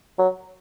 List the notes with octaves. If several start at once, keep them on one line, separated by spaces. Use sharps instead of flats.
F#3